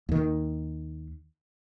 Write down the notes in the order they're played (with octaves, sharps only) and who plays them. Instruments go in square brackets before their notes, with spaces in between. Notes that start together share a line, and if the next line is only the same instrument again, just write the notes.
[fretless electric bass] D#2 D#3